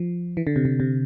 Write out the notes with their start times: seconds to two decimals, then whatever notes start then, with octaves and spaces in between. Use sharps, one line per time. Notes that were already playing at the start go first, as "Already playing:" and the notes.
Already playing: F3
0.37 E3
0.47 D3
0.56 C3
0.65 D3
0.80 C3